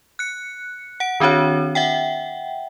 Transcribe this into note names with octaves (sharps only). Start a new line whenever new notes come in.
F#6 C#7
F#5 D7
D#3 C4 D4 F#4 C#5
E5 F#5 G5